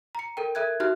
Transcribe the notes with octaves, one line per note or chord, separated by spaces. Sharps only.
A#5 C#7
A4 A#4 G5
A4 A#4 E5 F#6 G#6
D#4 F#4 G4 E5 F6 F#6